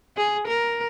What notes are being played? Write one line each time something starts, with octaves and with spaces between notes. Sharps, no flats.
G#4
A#4